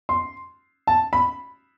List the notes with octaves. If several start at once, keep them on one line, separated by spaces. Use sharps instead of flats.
C6
A5
B5